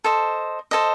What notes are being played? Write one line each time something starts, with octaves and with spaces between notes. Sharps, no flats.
A4 C5 D#5
A4 C5 D#5